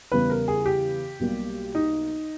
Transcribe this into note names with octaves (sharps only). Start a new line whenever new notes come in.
E2 C#3 G3 B3 B4
A#4
G#4
G4
B1 B2 G3 A#3
D#4